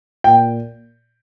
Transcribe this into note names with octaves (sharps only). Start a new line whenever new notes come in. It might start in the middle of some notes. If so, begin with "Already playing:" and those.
A#2 G5